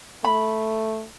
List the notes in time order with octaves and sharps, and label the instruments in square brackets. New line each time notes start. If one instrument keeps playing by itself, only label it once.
[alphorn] A3 [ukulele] B5